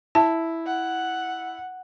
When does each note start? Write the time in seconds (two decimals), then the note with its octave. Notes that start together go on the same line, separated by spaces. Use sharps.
0.15 E4 A5
0.66 F#5